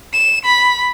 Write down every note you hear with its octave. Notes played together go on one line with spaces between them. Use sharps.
E7
B5